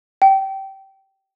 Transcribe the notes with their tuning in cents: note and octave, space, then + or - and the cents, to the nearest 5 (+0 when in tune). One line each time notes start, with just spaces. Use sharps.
G5 -20